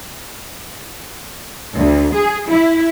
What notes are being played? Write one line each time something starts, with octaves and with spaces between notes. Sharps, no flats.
D2
G#4
E4